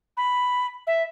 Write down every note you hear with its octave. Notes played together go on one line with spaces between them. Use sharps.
B5
E5